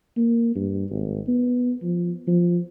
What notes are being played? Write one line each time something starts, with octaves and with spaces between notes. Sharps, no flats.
A#3
G2
G#1
B3
F3
F3